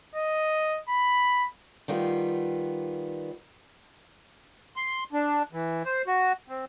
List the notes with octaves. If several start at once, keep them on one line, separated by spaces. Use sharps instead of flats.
D#5
B5
D#3 G3 B3 F4
C6
D4
E3
C5
F#4
C4